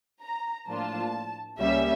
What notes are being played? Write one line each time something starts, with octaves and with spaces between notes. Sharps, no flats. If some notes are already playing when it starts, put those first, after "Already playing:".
A#5
A2 F3 A#3 D4 F4 A5
C#2 C#3 G3 A#3 C#4 E5